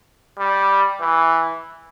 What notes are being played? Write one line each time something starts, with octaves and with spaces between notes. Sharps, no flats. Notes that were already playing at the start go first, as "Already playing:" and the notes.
G3
E3